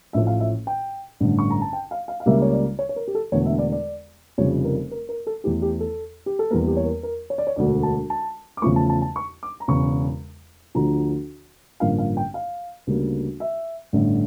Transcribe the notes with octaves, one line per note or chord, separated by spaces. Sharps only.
A1 A2 F3 A3 E5
F5
E5
G5
A1 G2 D3 A3
C#6
A#5
A5
G5
F5
F5
F5
C#2 C#3 G3 A#3 E5
C#5
D5
C#5
C#5
A#4
G4
A4
E1 E2 D3 A3 C#5
E5
D5
D5
F1 F2 C#3 G3 C#5
A#4
A#4
A#4
A4
E2 E3 A3 G4
G4
A4
G4
A4
E2 E3 G3 A#3 A#4
G4
C#5
A#4
A#4
C#5
D5
C#5
E1 D2 D3 D5
A5
A5
D6
E2 C#3 F3 A3 C#6
A5
A5
A5
C#6
D6
A#5
E1 E2 C#3 C#6
D2 D3 F3 A#5
A1 G2 D3 F3 A#3 F5
F5
G5
F5
D2 C#3 G3 A#3
E5
A1 G2 D3 A3